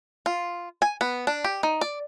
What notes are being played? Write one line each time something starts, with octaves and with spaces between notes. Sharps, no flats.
F4
G#5
B3
D4
G4
D#4
D5